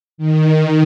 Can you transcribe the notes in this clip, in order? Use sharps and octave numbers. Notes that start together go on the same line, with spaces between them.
D#3